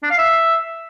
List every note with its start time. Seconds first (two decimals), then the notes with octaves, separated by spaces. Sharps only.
0.03 D4
0.10 F5
0.18 E5